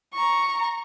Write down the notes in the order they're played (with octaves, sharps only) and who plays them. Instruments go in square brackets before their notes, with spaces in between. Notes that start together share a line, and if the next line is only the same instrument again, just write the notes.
[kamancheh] A#5 C#6